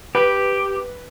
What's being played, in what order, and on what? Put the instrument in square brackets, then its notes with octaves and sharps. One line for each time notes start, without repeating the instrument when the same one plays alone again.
[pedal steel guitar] G4 [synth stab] B4